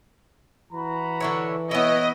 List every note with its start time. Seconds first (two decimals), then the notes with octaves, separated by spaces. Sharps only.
0.72 E3 F#4 A#5 B5
1.20 D3 E4 C#5
1.71 B3 E4 C#5 D#5